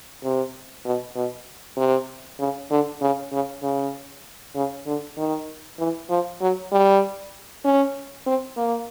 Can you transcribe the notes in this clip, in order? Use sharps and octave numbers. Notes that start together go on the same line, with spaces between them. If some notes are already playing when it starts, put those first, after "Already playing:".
C3
B2
B2
C3
C#3
D3
C#3
C#3
C#3
C#3
D3
D#3
E3
F3
F#3
G3
C#4
C4
A#3